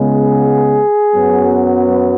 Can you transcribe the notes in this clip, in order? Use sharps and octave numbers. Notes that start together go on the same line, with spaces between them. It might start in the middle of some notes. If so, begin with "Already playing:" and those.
Already playing: C#2 C#3 G#3 B3 G#4
F#2 F#3 B3